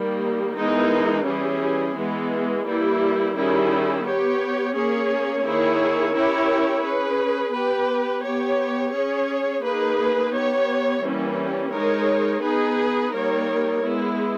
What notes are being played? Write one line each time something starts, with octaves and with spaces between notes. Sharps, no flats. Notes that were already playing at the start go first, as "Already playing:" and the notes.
Already playing: D#3 G3 A#3
E3 G#3 B3 D#4 A#4
E3 G3 C#4 G#4
E3 G#3 B3
E3 G3 A#3 E4
D#3 G3 C#4 E4 G#4
B3 G4 C#5
A#3 C#4 G#4 C#5
D#3 A#3 E4 G#4 C#5
C#4 E4 G4 A#4 C#5
C#4 G#4 B4
B3 G4 B4
B3 G4 C#5
C#4 G#4 C#5
A#3 D#4 G#4 B4
B3 G4 C#5
E3 G3 A#3 C#4
G#3 D#4 A#4 C#5
B3 D#4 G#4 B4
G3 A#3 D#4 A#4 C#5
G#3 B3 E4